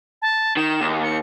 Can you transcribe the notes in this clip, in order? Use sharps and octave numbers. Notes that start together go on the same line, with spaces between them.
A5
D#3 E7
D#2
C#7